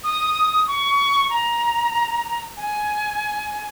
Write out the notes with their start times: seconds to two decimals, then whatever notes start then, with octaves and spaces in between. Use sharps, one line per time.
0.04 D#6
0.67 C#6
1.30 A#5
2.57 G#5